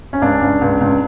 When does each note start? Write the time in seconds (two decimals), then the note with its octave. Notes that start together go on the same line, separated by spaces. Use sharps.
0.13 C#4
0.22 C#2 D4
0.41 C#2
0.61 C#2
0.81 C#2